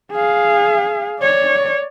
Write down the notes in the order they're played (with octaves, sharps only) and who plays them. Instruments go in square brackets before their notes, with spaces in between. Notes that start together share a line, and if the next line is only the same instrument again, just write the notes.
[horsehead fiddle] G#4 F5
C#5 D5